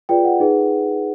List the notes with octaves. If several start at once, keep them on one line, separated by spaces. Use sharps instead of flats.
F4 G#4 B4 D5 G5
F#5
D#4 G#4 B4